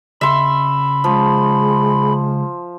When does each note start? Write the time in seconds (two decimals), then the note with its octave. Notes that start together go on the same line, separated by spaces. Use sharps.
0.21 C#3 E5 B5 C6
1.04 F3 G#3